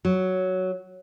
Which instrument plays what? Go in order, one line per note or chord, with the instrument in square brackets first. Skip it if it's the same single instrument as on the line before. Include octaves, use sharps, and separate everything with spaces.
[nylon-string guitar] F#3